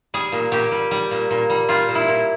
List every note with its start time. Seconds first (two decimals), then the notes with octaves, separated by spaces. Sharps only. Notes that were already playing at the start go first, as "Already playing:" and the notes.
0.14 G3 G#4
0.32 A#2
0.52 A#2 G4
0.71 G3
0.91 G3
1.11 A#2
1.31 A#2
1.50 G3
1.69 G3 F4
1.89 A#2
1.95 E4
2.08 A#2